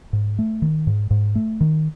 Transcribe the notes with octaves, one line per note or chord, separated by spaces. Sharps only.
G#2
A3
D#3
G#2
G#2
A3
D#3